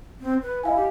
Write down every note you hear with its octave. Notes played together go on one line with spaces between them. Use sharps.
C4
B4
E4 D#5 F5 G#5
G4